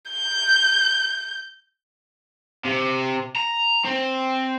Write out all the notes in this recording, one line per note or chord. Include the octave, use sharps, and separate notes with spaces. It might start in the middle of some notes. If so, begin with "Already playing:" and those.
G6
C3
A#5
C4